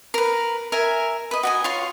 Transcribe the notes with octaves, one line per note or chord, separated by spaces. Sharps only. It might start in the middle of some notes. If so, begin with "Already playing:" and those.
A#4 B4
A#4 E5 G#5
B4 D#5
F#4 D#5 G#5
F4 C#5 C6